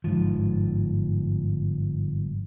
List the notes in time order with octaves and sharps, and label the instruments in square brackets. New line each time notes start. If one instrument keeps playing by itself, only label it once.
[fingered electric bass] G1 G#2 F3